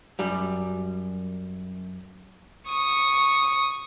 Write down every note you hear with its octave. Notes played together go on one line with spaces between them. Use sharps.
F#2 G3
C#6 D#6